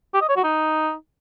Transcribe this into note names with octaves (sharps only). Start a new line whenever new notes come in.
G4
D#5
C#5
F#4
D#4